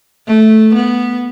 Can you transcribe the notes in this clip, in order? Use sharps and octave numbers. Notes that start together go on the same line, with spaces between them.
A3
B3